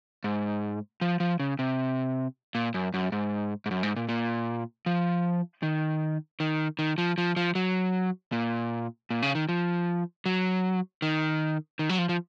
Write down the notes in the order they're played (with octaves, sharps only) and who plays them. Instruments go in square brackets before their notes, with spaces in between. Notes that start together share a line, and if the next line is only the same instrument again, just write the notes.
[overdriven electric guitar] G#2
F3
F3
C#3
C3
A#2
F#2
F#2
G#2
G#2
F#2
G#2
A#2
A#2
F3
D#3
D#3
D#3
F3
F3
F3
F#3
A#2
A#2
C#3
D#3
F3
F#3
D#3
D#3
F#3
F3
F3